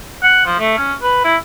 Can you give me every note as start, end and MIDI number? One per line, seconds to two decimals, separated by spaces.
0.23 0.42 78
0.46 0.55 53
0.59 0.76 57
0.78 0.94 61
1.03 1.21 71
1.24 1.36 64